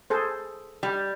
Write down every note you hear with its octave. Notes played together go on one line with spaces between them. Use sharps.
G#4 A4 C5
G3